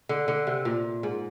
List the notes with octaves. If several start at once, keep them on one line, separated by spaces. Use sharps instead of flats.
D3
D3
C3
A#2
G#2